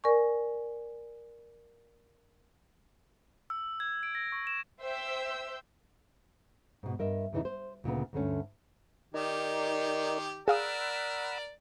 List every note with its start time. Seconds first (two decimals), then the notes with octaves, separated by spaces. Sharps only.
0.04 A#4 D5 G#5 C#6
3.50 E6
3.80 G#6
4.03 D7
4.15 A#6
4.32 C#6
4.47 E7
4.81 C5 E5 G5 E6 G6
6.83 G#2 B2
6.99 G2 A#4 D#5 E5
7.33 E2 C#3 E3 D#4 E4
7.45 C5
7.84 D2 A#2 C#3 B3
8.13 D2 G2 D3 A3 C#4
9.14 D#3 D#4 G4 A#4 D5
10.48 G#4 A#4 D5 F5 F#5 B5 D#6 E6